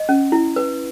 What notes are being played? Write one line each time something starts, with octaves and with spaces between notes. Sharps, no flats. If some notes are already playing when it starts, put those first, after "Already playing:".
Already playing: D#5
C#4
E4
B4